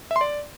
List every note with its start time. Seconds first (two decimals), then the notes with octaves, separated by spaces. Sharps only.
0.11 E5
0.16 C6
0.21 D5